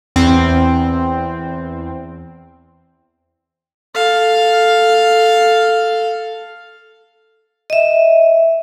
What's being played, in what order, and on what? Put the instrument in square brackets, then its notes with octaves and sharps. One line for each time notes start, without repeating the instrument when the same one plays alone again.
[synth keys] E2 C4
[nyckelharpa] A4 F5
[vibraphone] D#5 E5